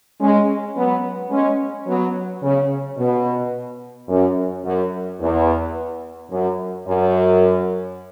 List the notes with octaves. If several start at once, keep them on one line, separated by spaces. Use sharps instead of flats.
G#3 C#4
F#3 B3
G#3 C#4
F#3 B3
C#3
B2
F#2
F#2
E2
F#2
F#2